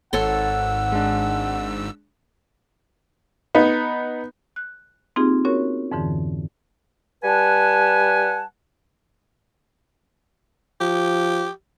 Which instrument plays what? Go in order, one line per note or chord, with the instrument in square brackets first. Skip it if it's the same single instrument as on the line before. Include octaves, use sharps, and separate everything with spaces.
[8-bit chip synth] G#1 G#2 E6 [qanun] A4 C#5 C6 [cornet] F#5
[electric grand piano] G#3 D4
[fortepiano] B3 D#4
[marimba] F#6
A#3 C4 D#4 F4 G4 G#4
B3 C#4 F#4 G#4 A#4 C#5
F2 G#2 D3 E3
[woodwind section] G3 B4 F#5 G#5 A5
[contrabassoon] F3 [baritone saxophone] G4